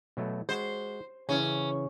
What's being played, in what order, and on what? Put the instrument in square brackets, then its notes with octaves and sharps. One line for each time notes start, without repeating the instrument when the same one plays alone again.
[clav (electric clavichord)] B2 F#3 A3
[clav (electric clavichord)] G#3 F#4 [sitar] C5
[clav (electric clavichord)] C#3 E3 [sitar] C#4